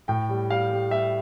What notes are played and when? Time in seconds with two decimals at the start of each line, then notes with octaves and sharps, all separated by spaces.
0.08 A2 G5
0.29 G3
0.50 G3 F5
0.71 G3
0.91 G3 E5